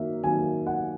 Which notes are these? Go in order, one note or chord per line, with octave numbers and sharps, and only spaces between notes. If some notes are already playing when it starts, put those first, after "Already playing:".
Already playing: D#3 F#3 A#3 E5
D#3 F#3 A#3 G#5
F#5